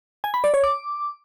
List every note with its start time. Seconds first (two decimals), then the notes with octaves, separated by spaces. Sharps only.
0.24 G#5
0.34 B5
0.44 D5
0.54 C#5
0.64 D6